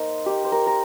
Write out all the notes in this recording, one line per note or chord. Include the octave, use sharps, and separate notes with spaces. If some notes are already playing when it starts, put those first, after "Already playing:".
Already playing: A#3 D#4 C5 D#5
A#3 D#4 G4
C5
A#4
A#4